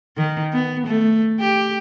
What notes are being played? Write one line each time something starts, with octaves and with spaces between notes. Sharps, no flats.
D#3
B3
A3
G4